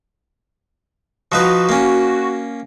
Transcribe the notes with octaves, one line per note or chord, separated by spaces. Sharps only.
F3 D#4 F#4 B4
A#3 C#4